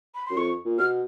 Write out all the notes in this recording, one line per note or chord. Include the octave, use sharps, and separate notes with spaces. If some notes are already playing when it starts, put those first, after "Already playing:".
B5
F#2 C6
F2 C#6
A#2
B2 F6